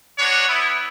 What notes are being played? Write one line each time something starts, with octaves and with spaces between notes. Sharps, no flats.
B3 D4 F#4 C#5
B3 E4